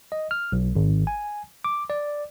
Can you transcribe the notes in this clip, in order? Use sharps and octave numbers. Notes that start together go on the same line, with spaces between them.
D#5
F6
B1
G#1
G#5
D6
D5